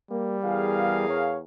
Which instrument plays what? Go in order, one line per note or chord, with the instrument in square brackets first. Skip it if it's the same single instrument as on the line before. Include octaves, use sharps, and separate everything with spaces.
[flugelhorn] G3 [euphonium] A#3
[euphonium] E2 [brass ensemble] G#4 A#4 F5
[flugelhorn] C#5